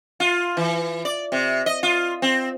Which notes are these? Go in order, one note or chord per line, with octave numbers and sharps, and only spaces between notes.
F4
E3
D5
C3
D#5
F4
C4